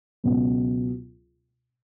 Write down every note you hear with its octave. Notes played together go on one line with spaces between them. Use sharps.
C#2 B2 F#3 B3